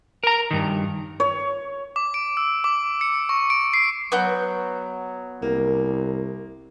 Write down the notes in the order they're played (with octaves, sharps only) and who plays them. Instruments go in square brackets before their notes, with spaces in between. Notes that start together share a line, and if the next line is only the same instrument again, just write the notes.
[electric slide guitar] A#4 A#5
G2 D#3
[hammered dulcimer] C#5
[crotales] D6
D7
E6
D6
C#7
C#6
D7
C7
[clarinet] F#3 [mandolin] B3 F#4 G6
[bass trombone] C2 [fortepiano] A#3